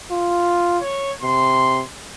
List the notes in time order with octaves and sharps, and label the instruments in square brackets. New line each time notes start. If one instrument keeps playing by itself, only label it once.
[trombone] F4
[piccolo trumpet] C#5
[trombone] C3 [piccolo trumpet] C6